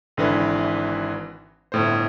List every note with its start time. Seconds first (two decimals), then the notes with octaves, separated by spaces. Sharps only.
0.17 G#1 D3 E3 B4
1.72 G1 A2 C5